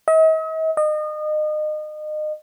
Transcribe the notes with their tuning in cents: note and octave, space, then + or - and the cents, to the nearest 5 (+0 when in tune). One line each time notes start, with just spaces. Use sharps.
D#5 +45
D#5 -30